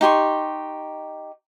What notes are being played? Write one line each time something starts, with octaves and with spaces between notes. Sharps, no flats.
D#4 G4 C6 C#6